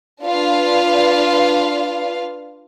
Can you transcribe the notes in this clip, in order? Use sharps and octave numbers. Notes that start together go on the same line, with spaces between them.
D4 F4 B4 F5